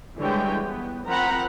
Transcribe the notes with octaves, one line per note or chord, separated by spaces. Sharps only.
D3 E3 G3 G#3 C#5 G5
B3
F3 C4 A#4 F#5 A#5 B5